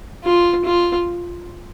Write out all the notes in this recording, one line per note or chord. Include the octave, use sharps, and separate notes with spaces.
F4
F4